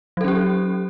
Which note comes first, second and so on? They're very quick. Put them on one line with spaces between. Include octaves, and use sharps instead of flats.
F#3 A4 C#4 G4